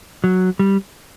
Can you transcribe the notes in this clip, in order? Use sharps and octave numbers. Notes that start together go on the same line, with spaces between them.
F#3
G3